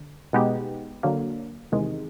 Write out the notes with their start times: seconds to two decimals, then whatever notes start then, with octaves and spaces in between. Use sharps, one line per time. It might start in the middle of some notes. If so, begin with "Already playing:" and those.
Already playing: D3
0.33 B2 G#3 B3 D#4 G4
1.03 D3 F#3 A#3
1.72 E2 C3 D#3 G#3